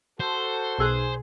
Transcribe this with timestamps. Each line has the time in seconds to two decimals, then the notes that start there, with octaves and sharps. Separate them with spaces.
0.20 F#4 A4 C5
0.78 B1 B2 G#4 E6 F#6